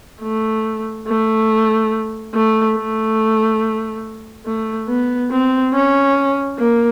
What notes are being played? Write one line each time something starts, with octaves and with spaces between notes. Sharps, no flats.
A3
A3
A3
A3
A3
B3
C4
C#4
A#3